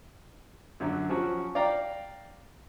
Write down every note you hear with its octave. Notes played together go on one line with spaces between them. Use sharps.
F#2 D3 F#3
F3 F#3 C#4 F#4
D5 F5 G5 A#5